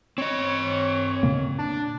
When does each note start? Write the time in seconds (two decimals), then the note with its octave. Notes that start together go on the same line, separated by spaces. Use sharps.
0.18 C4 C#5 D#5
1.23 A#2 C#3 A#3
1.59 D4